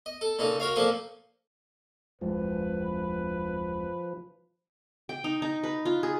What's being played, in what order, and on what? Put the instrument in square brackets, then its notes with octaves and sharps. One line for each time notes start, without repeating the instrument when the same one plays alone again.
[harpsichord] D#5
A4
A#2 C#3 D#4 A4
F#4 A#4 C#5 F5
A#2 F3 A#3 A4 C5 G#5
[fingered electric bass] D1 F2 G#3 [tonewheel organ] F3 [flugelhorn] B4
[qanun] G5
D#4
D#4
B4
F4
G#4